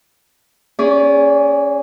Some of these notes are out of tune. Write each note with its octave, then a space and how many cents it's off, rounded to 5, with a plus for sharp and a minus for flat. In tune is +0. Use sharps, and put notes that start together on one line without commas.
C#4 +0 G#4 -10 D5 -30